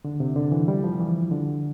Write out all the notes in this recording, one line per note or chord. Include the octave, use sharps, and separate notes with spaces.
D3
C3
D3
E3
G3
F3
E3
D3